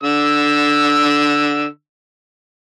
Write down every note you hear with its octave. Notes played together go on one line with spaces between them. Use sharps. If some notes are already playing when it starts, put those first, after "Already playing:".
D3 E6